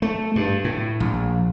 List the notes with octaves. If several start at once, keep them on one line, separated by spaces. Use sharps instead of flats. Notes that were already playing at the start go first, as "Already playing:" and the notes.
A3
G2
A2
A#1